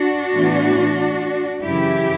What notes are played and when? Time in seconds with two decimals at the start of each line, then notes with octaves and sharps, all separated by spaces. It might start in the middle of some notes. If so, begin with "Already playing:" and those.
Already playing: D4 F#4
0.34 A2 E3 B3
1.65 F#2 C#3 E3 E4 G4